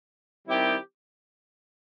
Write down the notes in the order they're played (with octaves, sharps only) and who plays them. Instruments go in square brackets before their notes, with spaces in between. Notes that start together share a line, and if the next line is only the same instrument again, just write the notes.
[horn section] D#3 G3 C4 E4 G4